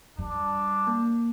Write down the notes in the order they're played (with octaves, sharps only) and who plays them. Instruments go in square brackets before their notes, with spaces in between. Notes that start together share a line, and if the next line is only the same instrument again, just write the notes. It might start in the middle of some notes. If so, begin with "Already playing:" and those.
[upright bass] G3 [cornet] D4
[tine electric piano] A#3